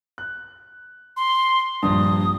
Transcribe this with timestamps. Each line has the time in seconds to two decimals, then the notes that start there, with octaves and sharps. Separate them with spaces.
0.18 F#6
1.17 C6
1.83 A#1 G2 D#6